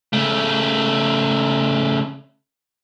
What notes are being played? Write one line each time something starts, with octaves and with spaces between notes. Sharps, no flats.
C#3 A3